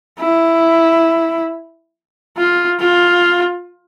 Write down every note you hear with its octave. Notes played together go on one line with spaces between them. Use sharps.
E4
F4
F4